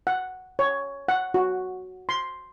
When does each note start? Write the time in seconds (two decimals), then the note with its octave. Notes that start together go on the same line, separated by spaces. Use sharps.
0.07 F#5
0.59 C#5
1.08 F#5
1.34 F#4
2.09 C6